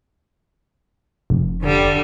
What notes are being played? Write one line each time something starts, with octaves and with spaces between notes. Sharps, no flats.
F1
D3 G3